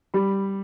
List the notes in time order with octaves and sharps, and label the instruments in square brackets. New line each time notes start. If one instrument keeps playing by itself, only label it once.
[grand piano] G3 B5